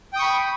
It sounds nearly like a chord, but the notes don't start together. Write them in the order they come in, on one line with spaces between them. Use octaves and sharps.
G5 D#6 C#6 B5